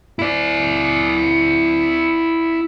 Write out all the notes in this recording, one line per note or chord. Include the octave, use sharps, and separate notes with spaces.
E4 D5